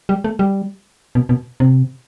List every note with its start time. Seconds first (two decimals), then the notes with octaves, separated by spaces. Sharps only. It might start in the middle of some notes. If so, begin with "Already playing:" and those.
0.09 G3
0.24 A3
0.39 G3
1.15 B2
1.29 B2
1.60 C3